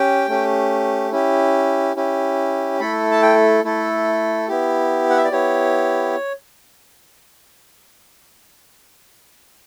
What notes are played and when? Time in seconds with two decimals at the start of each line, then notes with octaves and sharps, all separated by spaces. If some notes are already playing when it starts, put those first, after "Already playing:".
Already playing: C#4 G4 G5
0.28 A3 C#4 G4
1.11 C#4 E4 G4
1.96 C#4 E4 G4
2.80 A3 E4 A4 B5
3.11 A5
3.22 G5
3.64 A3 E4 A4
4.48 B3 E4 G4
5.10 F#5
5.17 E5
5.24 D5
5.31 B3 E4 G4 C#5